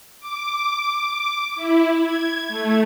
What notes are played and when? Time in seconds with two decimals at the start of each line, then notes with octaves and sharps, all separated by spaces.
0.20 D6
0.93 D6
1.55 E4
2.03 G#6
2.48 A3